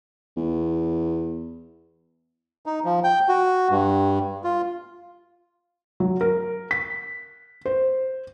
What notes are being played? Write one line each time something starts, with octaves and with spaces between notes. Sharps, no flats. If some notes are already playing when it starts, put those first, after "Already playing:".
E2
D#4
F3
G5
F#4
G2
F4
F#3
A#4
B6
C5